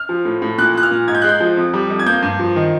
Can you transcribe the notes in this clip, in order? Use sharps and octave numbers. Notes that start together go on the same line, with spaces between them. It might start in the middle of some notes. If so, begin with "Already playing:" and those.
Already playing: F6
F3
A2
A2
A#2 F#6
A#2 F#6
F6
A#2
G#2 G#6
G6
G#3 F#6
G6
F3
F2
G3
F2
G#6
A#3 G6
G2
F3
D#3